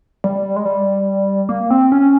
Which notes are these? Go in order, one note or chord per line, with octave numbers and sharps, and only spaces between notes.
G3
G#3
G3
A#3
C4
C#4